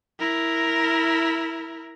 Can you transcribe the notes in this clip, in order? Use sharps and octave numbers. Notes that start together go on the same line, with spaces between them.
E4 A#4